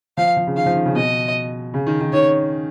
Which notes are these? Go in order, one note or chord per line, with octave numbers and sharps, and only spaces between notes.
F3 F5
F3
C#3
D#3 F5
F3
D#3
C#3
B2 D#5
C#3
D#3
D#3
D#3 C#5